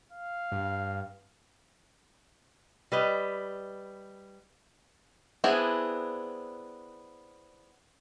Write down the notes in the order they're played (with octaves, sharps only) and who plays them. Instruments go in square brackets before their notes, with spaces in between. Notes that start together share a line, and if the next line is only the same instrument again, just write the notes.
[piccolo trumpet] F5
[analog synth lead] G2
[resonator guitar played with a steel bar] G3 B4 D#5
[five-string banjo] B3 C4 D4 E4 G#4